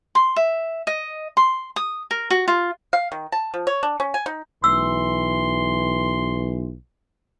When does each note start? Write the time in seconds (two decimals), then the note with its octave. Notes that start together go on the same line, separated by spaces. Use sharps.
0.15 C6
0.36 E5
0.87 D#5
1.37 C6
1.76 D#6
2.11 A#4
2.30 F#4
2.48 F4
2.93 F5
3.12 D#3
3.32 A5
3.54 F3
3.67 C#5
3.83 D4
4.00 C#4
4.14 G#5
4.26 D#4
4.64 B1 E3 C6 E6